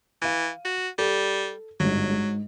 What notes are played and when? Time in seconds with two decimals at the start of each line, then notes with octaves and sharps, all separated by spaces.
0.22 E3 F5 D#7
0.65 F#4
0.98 G3 A4
1.80 G1 G#2 F#3
2.11 G#2